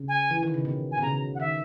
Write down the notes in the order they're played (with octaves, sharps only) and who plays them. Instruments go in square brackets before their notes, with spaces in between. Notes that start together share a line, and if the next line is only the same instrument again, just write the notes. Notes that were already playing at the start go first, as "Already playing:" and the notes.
Already playing: [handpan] C#3
[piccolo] G#5
[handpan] E3
D#3
C#3
B2
[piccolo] G#5
[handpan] B2
[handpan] C#3 [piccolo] A#5
[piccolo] F#5
[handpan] D#3 [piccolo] E5